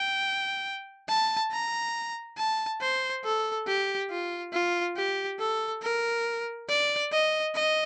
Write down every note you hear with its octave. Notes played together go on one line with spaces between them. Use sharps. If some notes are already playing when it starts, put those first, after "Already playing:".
Already playing: G5
A5
A#5
A5
C5
A4
G4
F4
F4
G4
A4
A#4
D5
D#5
D#5